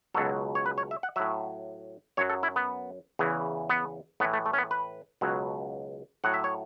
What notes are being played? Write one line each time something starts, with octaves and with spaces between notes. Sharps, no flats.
C#2 B2 F#3 A4
C#5
B4
C#5
E5
F#5
A2 F#3 E5
F#2 F#3 C#5
A4
E4
B3
E2 C#3 E3
B3
A2 E3 B3
A3
A3
C#4
B3
B4
C#2 B2 F#3
A2 F#3 F#5
E5
C#5